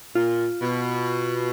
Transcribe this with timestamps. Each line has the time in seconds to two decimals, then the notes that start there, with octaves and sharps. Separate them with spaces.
0.15 A#2 F4
0.61 B2